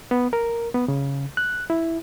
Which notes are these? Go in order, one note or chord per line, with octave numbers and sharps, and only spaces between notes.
B3
A#4
B3
C#3
F#6
E4